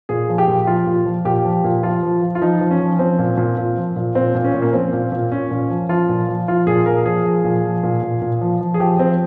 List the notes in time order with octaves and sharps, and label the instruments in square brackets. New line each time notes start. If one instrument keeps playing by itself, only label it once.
[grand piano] A#2 G#4
F3
G4
A#2
F3 F4
A#2
F3
A#2 G4
F3
A#2
F3 F4
F3
F3
F4
F3 D#4
F3
C#4
F3
F3 C4
A#2
A#2
A#2
F3
A#2
A#2 C4
A#2
C#4
A#2
A#3
F3 C4
A#2
A#2
A#2 C#4
A#2
F3
F3 F4
A#2
F3
F3 F4
A#2 G#4
A#2 A#4
F3 G#4
F3
A#2
F3
A#2
A#2
A#2
F3
F3
G#4
F3 G4
F3 C4